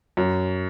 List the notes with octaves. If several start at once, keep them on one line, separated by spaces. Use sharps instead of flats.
F#2